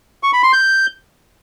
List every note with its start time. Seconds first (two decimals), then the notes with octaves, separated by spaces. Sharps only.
0.23 C#6
0.33 B5
0.43 C6
0.53 G6